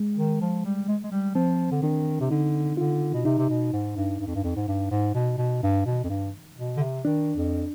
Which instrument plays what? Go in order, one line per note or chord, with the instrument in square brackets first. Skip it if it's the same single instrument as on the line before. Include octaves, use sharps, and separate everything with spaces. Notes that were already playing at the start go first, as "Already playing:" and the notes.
Already playing: [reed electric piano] G#3
[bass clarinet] D#3
F3
G3
G#3
G#3
G3
[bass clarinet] F3 [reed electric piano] C4
[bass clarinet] D3
[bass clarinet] D#3 [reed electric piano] D4
[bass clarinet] C3
[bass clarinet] D3 [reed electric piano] D#4
[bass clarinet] D3 [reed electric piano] F4
[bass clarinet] B2
[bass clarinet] C3 [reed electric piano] D#4
[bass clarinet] C3
B2
G#2
G2
G2
F2
G2
F2
G#2
G2
G#2
B2
B2
G2
B2
F2
G2
B2
D3
C3
[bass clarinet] D#3 [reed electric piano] D4
[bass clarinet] F2